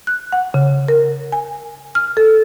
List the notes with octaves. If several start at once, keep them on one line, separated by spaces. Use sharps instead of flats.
F#6
F#5
C#3
A#4
G#5
F6
A4